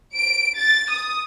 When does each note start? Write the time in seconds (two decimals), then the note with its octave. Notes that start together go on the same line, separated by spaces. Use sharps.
0.15 D7
0.58 A6
0.91 D#6